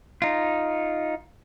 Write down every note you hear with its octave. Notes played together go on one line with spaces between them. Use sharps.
D#4 F4